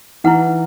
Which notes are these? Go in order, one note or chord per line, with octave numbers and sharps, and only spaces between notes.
E3 E4 B4 F#5